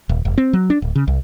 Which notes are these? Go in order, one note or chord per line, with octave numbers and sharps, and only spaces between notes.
D#1
F1
C4
F#3
D4
D1
C#3
C2